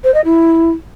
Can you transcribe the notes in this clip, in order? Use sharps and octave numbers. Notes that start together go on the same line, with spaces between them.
C5
D#5
E4